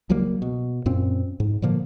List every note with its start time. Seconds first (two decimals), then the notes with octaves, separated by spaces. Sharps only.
0.10 C#2 F#3 G3 A#3
0.42 B2
0.86 F#2 A#2 C4 C#4
1.40 G#2
1.62 A#2 D3 F3 A#3